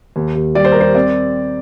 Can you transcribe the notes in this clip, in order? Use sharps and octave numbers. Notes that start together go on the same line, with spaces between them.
D#2
D#2
G3 D5
C5
G3 A#4
C5
C4 D5